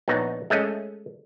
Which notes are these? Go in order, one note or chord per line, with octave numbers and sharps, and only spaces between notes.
A#1 B3 D#4 C#5 A#5
G#3 A3 C#4 D#5